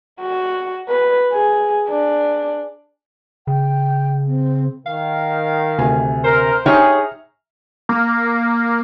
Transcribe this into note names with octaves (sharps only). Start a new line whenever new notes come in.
F#4
B4
G#4
D4
C#3 G5
C4
D#3 F5
D2 C3 G#5
A#4 C5
D#4 G4 G#4 C#5 E5 A#5 F6
A#3